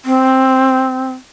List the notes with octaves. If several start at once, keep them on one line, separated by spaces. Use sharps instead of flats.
C4